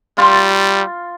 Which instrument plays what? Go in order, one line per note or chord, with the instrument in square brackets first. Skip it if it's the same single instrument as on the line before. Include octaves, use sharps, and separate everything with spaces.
[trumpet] G3 [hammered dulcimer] F4